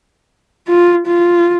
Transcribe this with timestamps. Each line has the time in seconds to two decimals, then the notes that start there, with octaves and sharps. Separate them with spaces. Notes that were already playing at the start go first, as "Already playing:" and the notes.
0.68 F4
1.07 F4